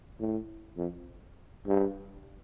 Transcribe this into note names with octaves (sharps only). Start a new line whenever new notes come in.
A2
F2
G2